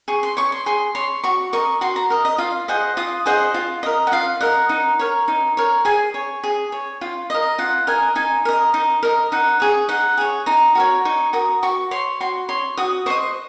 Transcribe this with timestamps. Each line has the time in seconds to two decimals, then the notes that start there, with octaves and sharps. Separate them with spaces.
0.08 G#4 C#6
0.23 C6
0.37 C#5 C#6
0.52 C6
0.66 G#4 C6
0.95 C#5 C6
1.24 F#4 C#6
1.53 A#4 D#5 C#6
1.81 F#4 C6
1.96 A#5
2.10 A#4 D#5
2.25 D#5
2.38 F4 F5
2.68 G#4 C5 D#5 F#5
2.97 F4 D#6
3.26 G#4 C5 D#5 F#5
3.54 F4
3.83 A#4 D#5
4.07 F#5
4.12 F4 F5
4.41 A#4 D#5 F#5
4.69 D#4
4.99 A#4 C#5
5.28 D#4
5.57 A#4 C#5
5.85 G#4 G#5
6.14 C#5
6.43 G#4
6.72 C#5
7.01 F4
7.30 A#4 D#5
7.58 F4 F#5
7.87 A#4 D#5 G#5
8.15 D#4 G#5
8.45 A#4 D#5
8.74 D#4
9.03 A#4 D#5
9.32 D#4 F#5
9.60 G#4 C#5
9.89 D#4 F#5
10.18 G#4 C#5
10.46 D#4 A#5
10.75 F#4 A#4 C#5
11.05 D#4 C#6
11.33 F#4 A#4 D#6
11.63 F#4 C#6
11.91 C#5 C6
12.20 F#4 C6
12.49 C#5 C6
12.77 F#4 D#6
13.06 C5 D#5 C#6